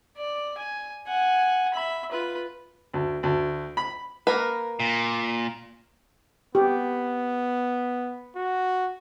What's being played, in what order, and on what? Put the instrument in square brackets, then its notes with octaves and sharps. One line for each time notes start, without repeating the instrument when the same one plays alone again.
[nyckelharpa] D5
G#5
F#5 G#5
E5 B5
F4 B4
[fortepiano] D2
D2
B5
[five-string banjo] A#3 A#4 B4
[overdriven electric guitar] A#2
[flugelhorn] B3 [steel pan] G4
[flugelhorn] F#4